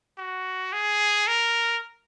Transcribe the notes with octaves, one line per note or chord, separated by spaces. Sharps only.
F#4
G#4
A#4